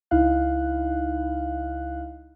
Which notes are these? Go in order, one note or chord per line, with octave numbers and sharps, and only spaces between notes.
C#2 D#4 E4 F5 F#6